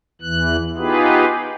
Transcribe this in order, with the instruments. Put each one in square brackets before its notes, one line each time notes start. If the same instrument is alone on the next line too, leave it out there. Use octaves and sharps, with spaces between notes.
[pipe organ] E2 E3 F#6
B3 D#4 F4 G4 G#4 B4